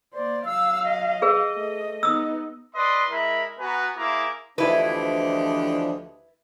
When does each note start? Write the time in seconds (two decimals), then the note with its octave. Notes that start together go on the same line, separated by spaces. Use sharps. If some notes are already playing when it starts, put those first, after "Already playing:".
0.14 A#3 C5 D5
0.45 F#3 F5 E6
0.84 D#5
1.22 G#4 B4
1.52 A3
2.03 B3 D#4 D#6 E6
2.75 B4 D5 D#5 C6
3.10 G#3 E4 A#4 E5 A#5 B5
3.59 B3 F#4 B4 G#5 A#5
3.96 A#3 E4 G#4 C5 A#5 D6
4.58 D2 E3 F3 D4 E4 G4 B4 D#5